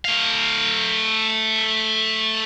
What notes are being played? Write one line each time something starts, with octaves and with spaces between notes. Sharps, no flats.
A3 F5